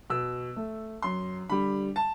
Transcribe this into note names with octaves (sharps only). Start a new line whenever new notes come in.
B2 E6
A3
F#2 C6
D3 G3 B5
A5